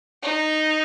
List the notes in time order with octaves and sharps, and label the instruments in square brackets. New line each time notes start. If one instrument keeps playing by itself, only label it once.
[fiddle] D#4